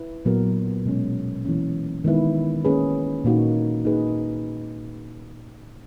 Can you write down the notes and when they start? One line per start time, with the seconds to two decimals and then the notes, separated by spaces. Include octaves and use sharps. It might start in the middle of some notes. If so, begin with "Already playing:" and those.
Already playing: E4 B4
0.25 A#2 F#3 B3 F#4 A#4
0.85 B2 G#3 C#4
1.45 E3 A#3 C#4
2.04 D#3 G#3 B3 E4 B4
2.65 A#3 C#4 G#4 B4
3.24 A#2 A#3 D#4 F#4
3.85 A#3 D#4 G#4 B4